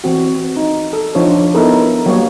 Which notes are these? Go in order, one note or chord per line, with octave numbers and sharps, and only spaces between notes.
E3 C4 F#4
D#4
A4
F3 D4 D#4 F4 C5 C#5
B3 D#4 E4 A4 A#4
F#3 G3 A#3 C#5